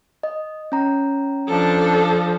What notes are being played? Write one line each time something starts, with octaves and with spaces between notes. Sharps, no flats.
D#5
C#4 A#5
F3 D4 A4